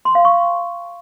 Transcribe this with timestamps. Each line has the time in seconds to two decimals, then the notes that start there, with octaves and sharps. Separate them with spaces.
0.05 C6
0.15 F5
0.25 C#6